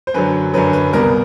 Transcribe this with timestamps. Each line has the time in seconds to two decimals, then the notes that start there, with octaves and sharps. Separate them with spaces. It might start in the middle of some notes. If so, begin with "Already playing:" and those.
0.07 C5
0.14 F#2 D3 F#3 B4
0.54 F#2 D3 F#3 B4
0.73 B4
0.93 C2 B2 G3 A#4